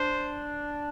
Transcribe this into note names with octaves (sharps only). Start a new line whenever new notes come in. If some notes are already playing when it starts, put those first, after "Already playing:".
Already playing: D4 C5